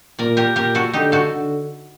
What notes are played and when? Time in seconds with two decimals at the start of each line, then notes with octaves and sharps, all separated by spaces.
0.19 A#2 A#4 D5
0.37 G4 A#4
0.56 A#2 G4 A#4
0.75 F#4 A4
0.93 D3 D#4 G4
1.12 F#4 A4
1.31 D3